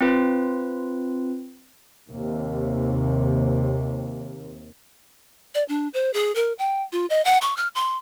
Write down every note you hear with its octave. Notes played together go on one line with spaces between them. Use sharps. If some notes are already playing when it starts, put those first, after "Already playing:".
C4 F4 B4
D#2 C3
D5
D4
C5
G#4
A#4
G5
F4
D#5
F#5
C#6
F6
C6